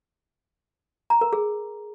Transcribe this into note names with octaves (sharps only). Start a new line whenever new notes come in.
A#5
A#4
G#4